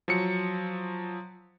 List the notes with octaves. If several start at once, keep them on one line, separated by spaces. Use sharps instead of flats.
F3 F#3 C#7